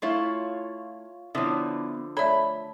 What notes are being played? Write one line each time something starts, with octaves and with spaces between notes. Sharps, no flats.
A3 E4 F4 C#5
D3 F3 B3 C#4 E4
A3 A4 C#5 D5 E5 B5